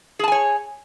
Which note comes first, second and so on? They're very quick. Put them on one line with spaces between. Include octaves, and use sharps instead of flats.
G#4 A5 G#5 C#5